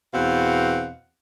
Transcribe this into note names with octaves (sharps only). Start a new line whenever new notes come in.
E2 B2 C4 F5 F#5